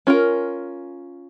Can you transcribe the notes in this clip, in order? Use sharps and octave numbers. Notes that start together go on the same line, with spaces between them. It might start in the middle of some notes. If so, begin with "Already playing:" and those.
C#4 F4 A#4